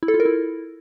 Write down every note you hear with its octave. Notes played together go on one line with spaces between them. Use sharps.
E4
A4
F4
A#4
E4